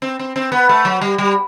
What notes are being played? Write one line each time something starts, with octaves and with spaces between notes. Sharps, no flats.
C4
C4
C4
B3
A3
F#3
G3
G3